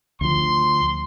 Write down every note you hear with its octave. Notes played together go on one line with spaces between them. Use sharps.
D2 F3 C6